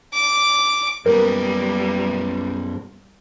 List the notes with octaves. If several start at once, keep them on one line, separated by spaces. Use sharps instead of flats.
D6
F#2 G3 A#3 B3 A#4